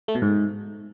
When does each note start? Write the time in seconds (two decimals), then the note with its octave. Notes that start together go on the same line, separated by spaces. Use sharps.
0.08 A3
0.15 B2
0.22 G#2